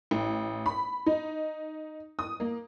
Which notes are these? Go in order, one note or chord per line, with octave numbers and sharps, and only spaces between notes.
A1
B5
D#4
D#6
A#3